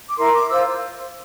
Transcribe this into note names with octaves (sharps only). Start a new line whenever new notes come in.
D6
E4 A#4 C6
D6
F4 C5 E6